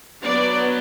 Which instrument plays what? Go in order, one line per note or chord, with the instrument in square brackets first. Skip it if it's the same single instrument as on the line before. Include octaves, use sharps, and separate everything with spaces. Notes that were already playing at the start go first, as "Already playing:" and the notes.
[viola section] F#3 B3 D4 D5